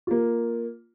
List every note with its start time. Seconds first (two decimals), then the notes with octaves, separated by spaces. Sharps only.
0.07 A#3 F4